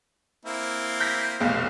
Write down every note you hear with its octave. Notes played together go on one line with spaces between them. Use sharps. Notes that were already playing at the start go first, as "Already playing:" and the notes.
A#3 C4 E4
G6 A#6 B6
F1 B1 F5